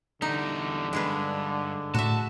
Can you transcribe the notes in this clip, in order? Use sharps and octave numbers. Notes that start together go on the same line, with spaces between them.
E2 D3 G3 D#4
G2 G#3 G#4 B4
A2 F#4 E5 A5